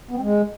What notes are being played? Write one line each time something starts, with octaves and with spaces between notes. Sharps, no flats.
B3
C4
G#3